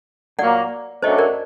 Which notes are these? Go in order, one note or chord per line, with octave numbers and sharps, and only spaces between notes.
A#2 F#3 A#3 D5 F#5
F#2 F#3 A3 D4 C5 D#5
A#4 D5